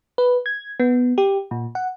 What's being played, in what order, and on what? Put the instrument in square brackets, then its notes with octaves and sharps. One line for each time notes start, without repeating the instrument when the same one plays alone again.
[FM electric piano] B4
G#6
B3
G4
A#2
F#5